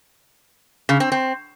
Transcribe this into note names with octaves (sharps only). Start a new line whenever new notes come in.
C#3
C4
C4